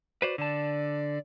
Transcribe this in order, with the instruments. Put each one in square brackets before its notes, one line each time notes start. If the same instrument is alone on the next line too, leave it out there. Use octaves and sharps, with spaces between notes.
[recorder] F#4 [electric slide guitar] B4 C5 D5
[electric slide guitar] D3 A5 [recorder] D5